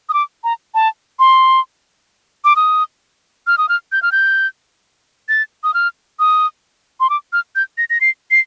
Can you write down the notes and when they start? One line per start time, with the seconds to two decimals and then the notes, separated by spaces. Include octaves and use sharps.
0.09 D#6
0.14 D6
0.44 A#5
0.74 A5
1.19 C6
2.44 D6
2.56 D#6
3.47 F6
3.58 D#6
3.69 F6
3.92 G6
4.02 F6
4.12 G6
5.29 A6
5.64 D#6
5.74 F6
6.19 D#6
7.00 C6
7.10 D6
7.33 F6
7.56 G6
7.78 A#6
7.90 A#6
8.01 C7
8.31 C7